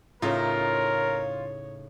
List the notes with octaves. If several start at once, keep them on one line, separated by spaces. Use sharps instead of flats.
A2 C#3 D#4 F4 A#4 C#5